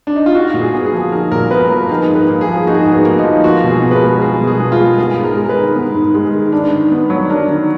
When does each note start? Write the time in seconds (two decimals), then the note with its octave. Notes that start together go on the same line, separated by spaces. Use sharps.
0.07 D4
0.16 D#4
0.26 F4
0.35 D#4 F#4
0.54 A#2
0.61 G#4
0.74 B3
0.86 G#4
0.94 F3
1.12 D#4 A#4
1.32 A#2 A#4
1.51 B3 B4
1.70 F3 A#4
1.89 D#4 G#4
2.09 G#2
2.15 B4
2.28 A#3
2.41 G#4
2.48 F3
2.67 D#4 F#4
2.74 G#4
2.82 F#4
2.85 G#2
2.92 B3
3.05 A#3
3.19 D#4
3.24 F3
3.44 F4 F#4
3.64 B2
3.70 G#4
3.82 B3
3.91 B4
3.96 A#4
4.01 G#3
4.22 F4 G#4
4.41 B2
4.47 G#4
4.60 B3
4.72 F4
4.79 G#3
4.98 B3 G#4
5.17 G#2
5.24 A#4
5.36 G#3
5.45 A#4
5.49 B4
5.56 D#3
5.76 B3
5.95 G#2
6.14 G#3
6.33 D#3
6.52 D4
6.72 D#3
6.92 B3
7.10 F#3
7.30 D4 A#4
7.48 D#3